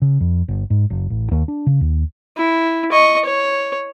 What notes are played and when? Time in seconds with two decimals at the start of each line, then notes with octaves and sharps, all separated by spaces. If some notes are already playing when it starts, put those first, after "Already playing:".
0.02 C#3
0.20 F2
0.48 G1
0.70 G#2
0.90 F#1
1.10 A1
1.31 D#2
1.48 D4
1.66 C#3
1.81 D#2
2.37 E4
2.92 D#5 C#6
3.25 C#5